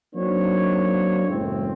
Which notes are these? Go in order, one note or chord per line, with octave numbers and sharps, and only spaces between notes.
F#3 A#3 C4 D4 D#4 C#5
F#1 E2 A2 G#3 C4